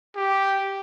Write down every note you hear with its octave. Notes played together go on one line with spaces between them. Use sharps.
G4